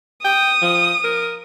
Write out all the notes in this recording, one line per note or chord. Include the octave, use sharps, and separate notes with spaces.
G5 D#6
F3
A#4